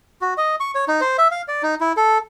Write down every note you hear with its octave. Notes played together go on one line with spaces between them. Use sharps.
F#4
D#5
C#6
C#5
D#4
C5
E5
F5
D5
D#4
E4
A4